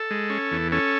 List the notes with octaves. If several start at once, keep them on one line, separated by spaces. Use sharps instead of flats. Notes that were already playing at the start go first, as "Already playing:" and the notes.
Already playing: A4
G#3
C#4
E2
C#4 A4